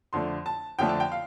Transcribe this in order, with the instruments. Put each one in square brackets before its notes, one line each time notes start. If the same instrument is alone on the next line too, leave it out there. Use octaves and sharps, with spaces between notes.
[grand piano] F2 D3 F3 A3 D4 C6
A5
F2 D3 F3 A3 D4 G5
A5
G5
F5